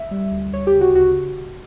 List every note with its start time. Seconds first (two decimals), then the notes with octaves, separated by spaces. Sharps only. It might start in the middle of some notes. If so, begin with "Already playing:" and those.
Already playing: E5
0.11 G3
0.32 D2
0.52 D2 C#5
0.67 G4
0.74 C#3
0.81 F#4
0.94 D2 F#4